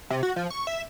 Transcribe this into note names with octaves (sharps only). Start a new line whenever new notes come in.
C3
F#4
F3
C#6
E5